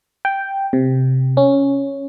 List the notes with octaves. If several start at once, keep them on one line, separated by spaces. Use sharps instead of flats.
G5
C3
C#4